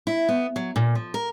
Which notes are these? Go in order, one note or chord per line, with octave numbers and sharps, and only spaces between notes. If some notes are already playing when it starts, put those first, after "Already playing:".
E4
B3
F#3
A#2
F3
A#4